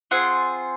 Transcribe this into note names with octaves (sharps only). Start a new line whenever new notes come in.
C4 F4 G#4 F#5